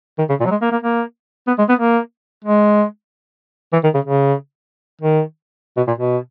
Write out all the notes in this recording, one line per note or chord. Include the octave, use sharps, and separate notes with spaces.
D#3
C#3
A#2
F#3
G#3
A#3
A#3
A#3
B3
G#3
B3
A#3
G#3
E3
D#3
C#3
C#3
D#3
B2
A#2
B2